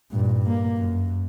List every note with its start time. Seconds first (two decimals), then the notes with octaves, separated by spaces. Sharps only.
0.12 G2 A#2
0.49 A#3
0.77 F#2